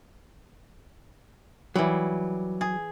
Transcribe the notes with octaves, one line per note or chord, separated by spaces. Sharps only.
E3 F#3 G3
G#4